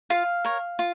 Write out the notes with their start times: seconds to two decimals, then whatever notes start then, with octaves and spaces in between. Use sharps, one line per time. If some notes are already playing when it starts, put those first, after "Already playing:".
0.10 F4 F5
0.45 A#4 C#5
0.79 F4